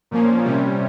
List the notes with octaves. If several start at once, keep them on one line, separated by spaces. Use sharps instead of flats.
A#2 F3 A#3 C#4
C3 G3 C#4